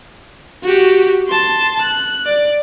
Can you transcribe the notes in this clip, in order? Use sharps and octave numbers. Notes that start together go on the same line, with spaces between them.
F#4 G4
A5 C6
F#6
D5